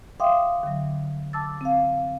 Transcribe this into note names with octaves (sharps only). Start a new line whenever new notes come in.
E5 F5 G5 C6 D6 D#6
D3 F#3
A5 D6 E6 A6
C4 F5